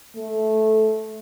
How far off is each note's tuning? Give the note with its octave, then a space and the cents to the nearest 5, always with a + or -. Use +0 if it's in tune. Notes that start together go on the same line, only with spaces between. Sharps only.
A3 -15